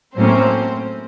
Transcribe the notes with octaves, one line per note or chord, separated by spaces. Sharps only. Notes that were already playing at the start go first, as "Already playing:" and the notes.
A2 F#3 A#3 C4 C#4 C5